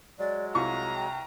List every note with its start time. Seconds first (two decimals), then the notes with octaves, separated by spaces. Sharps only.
0.19 F#3 G#3 D5
0.55 C2 F4 A#5 C#6
0.95 G5